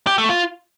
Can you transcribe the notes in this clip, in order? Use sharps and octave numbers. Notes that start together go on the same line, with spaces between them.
G4
A3
F4